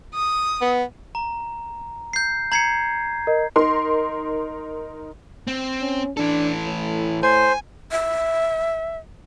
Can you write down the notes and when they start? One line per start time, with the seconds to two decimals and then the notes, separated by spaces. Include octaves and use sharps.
0.14 D#6
0.62 B3
1.15 A#5
2.13 G6 C7
2.52 A#5 G#6 C7 C#7 F#7
3.27 A#4 D#5
3.56 D#4 A#4 C6
5.47 C4
5.81 C#4
6.17 E3 D4 A4
6.67 A2
7.23 C5 G#5
7.91 E5